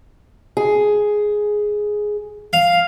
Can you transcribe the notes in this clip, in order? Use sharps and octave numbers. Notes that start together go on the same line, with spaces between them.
G#4
F5